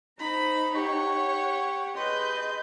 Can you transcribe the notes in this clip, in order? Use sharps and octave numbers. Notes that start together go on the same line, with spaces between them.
D#4 C5 A#5 B5
G4 C#5 F#5 C#6
G#4 B4 D#5 C6 G6